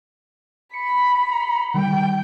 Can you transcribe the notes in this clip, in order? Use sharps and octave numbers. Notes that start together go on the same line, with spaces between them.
B5 C#7
D#3 G3 G5